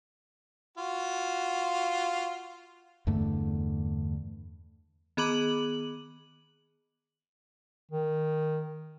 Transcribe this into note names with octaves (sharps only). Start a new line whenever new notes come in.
F4 F#4
E2 G2 D3 A3
D#3 B3 G#4 B5 D6 F#7
D#3